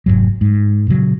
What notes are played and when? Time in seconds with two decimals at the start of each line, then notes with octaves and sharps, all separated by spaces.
0.06 F1 B1 G#2 F#3
0.41 G#2
0.88 A#2 C#3 E3 F#3